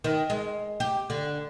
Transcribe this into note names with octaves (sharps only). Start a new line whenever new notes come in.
D#3
G#3
G4
D3